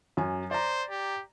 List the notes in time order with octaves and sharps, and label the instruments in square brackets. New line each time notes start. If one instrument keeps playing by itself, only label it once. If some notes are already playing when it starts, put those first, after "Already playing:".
[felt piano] F#2 G#5
[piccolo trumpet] C5 [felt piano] D5 A#5
[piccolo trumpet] G4